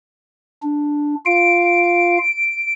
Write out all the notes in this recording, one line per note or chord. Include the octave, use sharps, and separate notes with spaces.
D4
F4 F5 D7